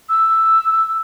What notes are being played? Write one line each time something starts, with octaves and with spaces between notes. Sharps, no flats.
E6